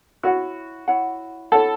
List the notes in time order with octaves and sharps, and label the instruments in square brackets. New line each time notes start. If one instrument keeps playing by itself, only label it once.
[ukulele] E4 C#5 F#5 [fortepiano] F#4
[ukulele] E4 C#5 F#5
[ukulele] E4 C#5 F#5 [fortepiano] A4